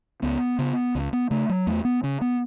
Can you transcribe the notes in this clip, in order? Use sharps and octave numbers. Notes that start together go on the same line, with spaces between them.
C#2 B3
C#3 B3
C#2
B3
C#3 A3
F#3
E2 A3
B3
C#3 C#4
B3